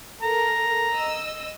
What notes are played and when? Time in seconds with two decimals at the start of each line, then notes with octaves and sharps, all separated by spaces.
0.23 A4 A#4 A#5
0.93 D#5 E6